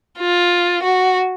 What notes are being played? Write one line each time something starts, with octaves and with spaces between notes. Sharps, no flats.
F4
F#4